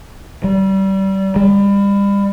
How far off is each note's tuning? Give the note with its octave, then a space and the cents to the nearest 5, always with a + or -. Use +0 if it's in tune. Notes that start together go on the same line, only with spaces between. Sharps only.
G3 -25
G3 +35